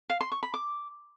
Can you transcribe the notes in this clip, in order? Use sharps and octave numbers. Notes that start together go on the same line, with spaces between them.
F5
C6
C#6
B5
D6